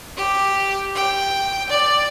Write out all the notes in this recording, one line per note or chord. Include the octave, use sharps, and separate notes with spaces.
G4
G5
D5